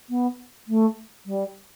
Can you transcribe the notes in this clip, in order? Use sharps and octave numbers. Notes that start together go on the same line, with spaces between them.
B3
A3
G3